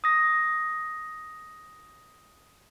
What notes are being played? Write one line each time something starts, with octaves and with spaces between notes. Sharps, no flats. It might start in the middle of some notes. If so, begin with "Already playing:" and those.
D#6 A#6